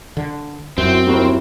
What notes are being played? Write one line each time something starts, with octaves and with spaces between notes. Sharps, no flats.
D3
F#2 C4 E4 F#4
D#2 G3 E4 F#4 A#4